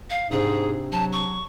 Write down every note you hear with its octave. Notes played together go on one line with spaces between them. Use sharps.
F5
G#2 C3 C4 D4 G#4
F#3 A5
C#6